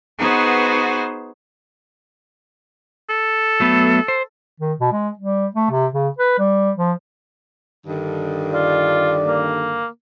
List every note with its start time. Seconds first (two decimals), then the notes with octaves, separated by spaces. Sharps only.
0.18 B3 D#4 F#4 G#4 B4 C5
3.09 A4
3.60 F#3 A3 B3
4.08 C5
4.60 D#3
4.80 B2
4.92 G#3
5.19 G3
5.55 A3
5.71 C3
5.92 C#3
6.18 B4
6.38 G3
6.77 F3
7.87 G2 D3 D#3
8.54 F4 D5
9.26 A#3